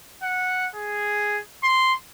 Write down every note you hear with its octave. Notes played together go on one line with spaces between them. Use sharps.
F#5
G#4
C6